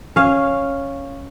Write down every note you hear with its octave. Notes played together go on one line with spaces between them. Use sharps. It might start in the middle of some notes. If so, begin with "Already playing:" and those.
C#4 F5